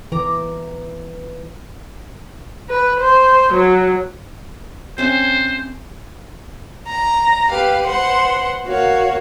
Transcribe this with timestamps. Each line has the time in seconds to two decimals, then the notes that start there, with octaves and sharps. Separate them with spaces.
0.12 E3 A#5 D6
2.69 B4
3.00 C5
3.53 F#3
4.98 C4 C#4 C5 E5
6.87 A#5
7.50 G4 B4 F5
7.86 B4 C5 F#5 C6
8.67 F#4 A#4 C#5 F5